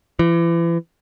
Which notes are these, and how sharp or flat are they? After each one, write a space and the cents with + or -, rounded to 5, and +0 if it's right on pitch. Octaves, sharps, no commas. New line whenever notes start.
E3 +35